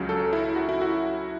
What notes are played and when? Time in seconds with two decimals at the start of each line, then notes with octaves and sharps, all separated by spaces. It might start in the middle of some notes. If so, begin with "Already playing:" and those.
Already playing: C#2 C#3 F#3
0.09 A4
0.33 E4
0.56 F#4
0.69 E4
0.82 F#4